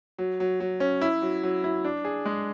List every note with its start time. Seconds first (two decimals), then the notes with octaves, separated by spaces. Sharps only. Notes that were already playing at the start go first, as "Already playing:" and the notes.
0.18 F#3
0.40 F#3
0.60 F#3
0.80 C#4
1.01 E4
1.22 F#3
1.43 F#3
1.64 E4
1.84 D4
2.05 G#4
2.25 G#3